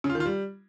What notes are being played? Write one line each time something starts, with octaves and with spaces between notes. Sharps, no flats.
C#3
F4
D#3
F4
G3